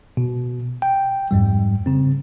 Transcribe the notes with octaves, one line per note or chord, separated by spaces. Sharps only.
B2
G5
F2 G#2 G3
C#3 C4